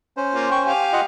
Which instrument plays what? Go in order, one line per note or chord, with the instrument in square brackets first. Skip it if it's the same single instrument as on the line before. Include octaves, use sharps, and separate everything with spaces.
[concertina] C#4 C5
[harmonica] A#3 F4
G5 C#6
G4 F5 G#5
[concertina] F4 D#5 F#5